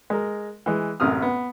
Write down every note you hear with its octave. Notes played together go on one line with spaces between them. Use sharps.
G#3 A#4
E3 G#3
A1 F#2 C3 D#6 F6
B3